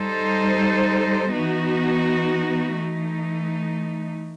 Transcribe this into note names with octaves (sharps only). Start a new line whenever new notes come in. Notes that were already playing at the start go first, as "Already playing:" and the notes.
Already playing: G3 D#4 A4 C5
E3 B3 D#4 F#4
E3 A3 D#4